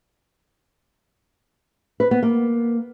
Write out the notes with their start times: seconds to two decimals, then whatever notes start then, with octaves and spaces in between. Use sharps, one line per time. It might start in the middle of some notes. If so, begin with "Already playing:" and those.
2.00 B4
2.11 B3
2.23 A#3